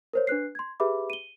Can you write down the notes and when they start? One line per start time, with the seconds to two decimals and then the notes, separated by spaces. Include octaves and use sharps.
0.13 A#4 C5 C#5
0.27 D4 B4 F#6 C7
0.55 C6 G#6
0.80 G4 G#4 B4 E5 B5 D6
1.10 D#7 G7